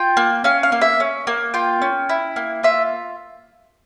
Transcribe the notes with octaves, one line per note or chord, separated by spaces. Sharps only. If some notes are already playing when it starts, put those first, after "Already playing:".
Already playing: F4 G5
A#3
C#4 F5
F5
A#3
E5
C#4
A#3
F4 G5
C#4
E4
A#3
F4 E5